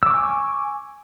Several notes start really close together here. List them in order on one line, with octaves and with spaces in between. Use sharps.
E6 D6 C#6 G#5